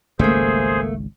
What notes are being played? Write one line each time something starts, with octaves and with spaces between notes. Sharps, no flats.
G#1 C#2 C#3 A3 A#3 G#4 C5